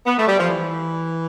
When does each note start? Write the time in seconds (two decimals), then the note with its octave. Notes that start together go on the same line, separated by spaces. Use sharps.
0.06 B3
0.18 A3
0.28 G3
0.39 F3
0.50 E3